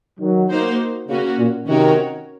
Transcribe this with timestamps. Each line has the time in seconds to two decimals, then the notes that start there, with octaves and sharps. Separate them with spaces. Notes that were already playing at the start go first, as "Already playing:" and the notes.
0.20 D#3 F#3
0.50 A#3 D#4 F#4 C5
1.08 A#2 C#3 A#3 C#4 F#4
1.38 A#2
1.67 C3 D#3 C#4 F#4 A#4 C#5